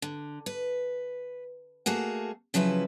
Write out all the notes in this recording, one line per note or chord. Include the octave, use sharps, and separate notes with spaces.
D3
B4
A3 A#3 F#4 G#4
C#3 F3 F#3 E4 B4